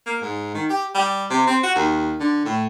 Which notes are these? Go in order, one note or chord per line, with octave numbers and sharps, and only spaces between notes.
A#3
G#2
D#3
G4
G3
C3
C4
F#4
D#2
D3
A2